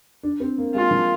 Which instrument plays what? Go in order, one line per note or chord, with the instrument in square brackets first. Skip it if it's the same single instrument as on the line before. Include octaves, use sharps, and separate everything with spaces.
[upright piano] D4
C4
A#3
[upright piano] G#3 [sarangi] F4
[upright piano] F3